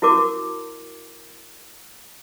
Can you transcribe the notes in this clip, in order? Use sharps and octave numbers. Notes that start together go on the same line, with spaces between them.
E4 F#4 A#4 D6